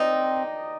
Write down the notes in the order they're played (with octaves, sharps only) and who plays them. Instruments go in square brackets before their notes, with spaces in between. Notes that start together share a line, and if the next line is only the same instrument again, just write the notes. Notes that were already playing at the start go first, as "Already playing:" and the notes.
Already playing: [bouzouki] C4 D#4 [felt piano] D5 D#5